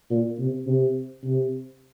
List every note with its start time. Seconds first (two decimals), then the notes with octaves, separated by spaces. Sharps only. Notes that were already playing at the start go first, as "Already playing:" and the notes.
0.11 A#2
0.39 C3
0.67 C3
1.25 C3